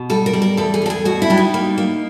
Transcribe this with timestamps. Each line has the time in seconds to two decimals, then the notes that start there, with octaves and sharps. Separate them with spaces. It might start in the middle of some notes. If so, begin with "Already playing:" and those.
Already playing: B2
0.10 G3 A4
0.26 A#4
0.33 G3
0.42 A#4
0.57 E2 A4
0.74 G#4
0.82 G3 A4
0.90 G#4
1.05 B2 F#4
1.22 E4
1.30 G3 D4
1.37 D#4
1.54 A#3
1.78 A#3